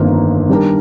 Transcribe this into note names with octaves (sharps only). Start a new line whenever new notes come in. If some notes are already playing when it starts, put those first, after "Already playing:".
Already playing: G1 F2 D#3 A#3
D#3 G3 D4 G4 A#4